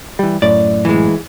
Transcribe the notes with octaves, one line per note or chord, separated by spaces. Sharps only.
E3 G3
F#2 A2 D5
E3 G#3